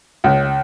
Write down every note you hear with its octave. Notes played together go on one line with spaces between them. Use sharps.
C#2